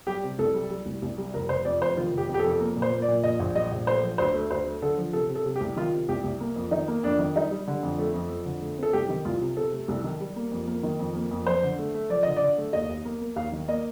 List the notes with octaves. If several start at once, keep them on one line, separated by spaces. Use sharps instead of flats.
G3 G4
C3
C2 A4
G3
G3
C2
C2
G3
F1 A#4
F1 C5
F2 D5
F1 C5
D#3 F4
F1 G4
F2
G4
A4
F2
A4
A#3 A#4
A#2
C5
A#3
D5
A#2
A#1 D#5
A#1
G3 D#5
A#1
A3 C5
F3
D2 C5
A3
D2 C5
A3
D3 A4
F3
C3 A4
C3
A4
C3
G4
C2
D#3 F4
C3
C2 G4
C2
A#3
F2
D#3 D#4
A#3
F2 D4
D#3
G3 D#4
G3
D3
F2
A3 A4
F2
F2
D3
A3
C4 A4
C2 G4
D#3
C2 F4
C3
C3 A4
A3
C2
D#3
G3
A#3
F2
A#3
D#3
F2
A#3
F2
F3 C5
D3
A3
A3
F3 D5
D3 D#5
D5
D3
A3
D#2 D#5
D#2
A#3
A#3
D#2 F5
D#3
A#3 D#5